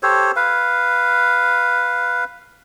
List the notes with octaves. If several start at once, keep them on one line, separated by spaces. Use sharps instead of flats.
G4 A4 C5 C#5
B4 F5